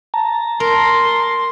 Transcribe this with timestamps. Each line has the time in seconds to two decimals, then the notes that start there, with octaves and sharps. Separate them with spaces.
0.14 A5 A#5
0.60 A#4 C6